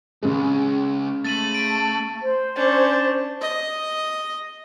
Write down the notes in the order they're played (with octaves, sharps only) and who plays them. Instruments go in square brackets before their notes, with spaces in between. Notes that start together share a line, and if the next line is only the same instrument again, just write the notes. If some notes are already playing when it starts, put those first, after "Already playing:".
[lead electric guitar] C#2 G#2 [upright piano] C#3 G#3
[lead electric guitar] A3 [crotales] A6 D#7 F#7
[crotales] A6 D7
[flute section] C5
[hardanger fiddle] C#4 D4
[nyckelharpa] D#5